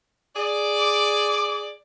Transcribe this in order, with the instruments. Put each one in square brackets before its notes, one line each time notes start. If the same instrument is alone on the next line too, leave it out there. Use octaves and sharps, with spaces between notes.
[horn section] G#4 D5
[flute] D6